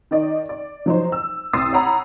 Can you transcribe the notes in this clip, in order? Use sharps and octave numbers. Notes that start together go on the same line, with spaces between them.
D#3 D#4 D5 D#5
D5
F3 F#3 D#4 C5
E6
C2 C6 D#6 E6 A6 C7
C#5 F#5 A#5 B5